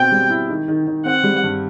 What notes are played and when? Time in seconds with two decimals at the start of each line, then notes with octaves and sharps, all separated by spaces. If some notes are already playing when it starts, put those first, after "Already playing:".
Already playing: B2 C4 G5
0.12 G3
0.30 E4
0.49 D#3
0.68 D#3
0.87 D#3
1.05 C4 F#5
1.24 G3
1.44 G2